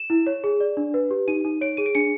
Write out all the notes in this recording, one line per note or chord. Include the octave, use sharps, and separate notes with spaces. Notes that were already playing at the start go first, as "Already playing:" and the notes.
Already playing: E7
E4
C#5
G#4
D5
D4
B4
G4
D#4 D#7
D#4
C#5 D7
G#4 D#7
D7
D4 C#7